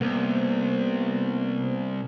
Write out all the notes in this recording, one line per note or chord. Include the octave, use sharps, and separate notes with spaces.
C2 A#3 B3